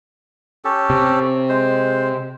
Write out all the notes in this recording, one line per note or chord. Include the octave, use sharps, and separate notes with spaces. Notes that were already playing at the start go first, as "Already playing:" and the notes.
C#4 G4 A4
C3
G#3 C5